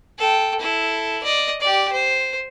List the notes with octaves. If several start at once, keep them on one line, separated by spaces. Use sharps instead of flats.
A4 G5
E4 A4
D5 D#5
G4 D5
C5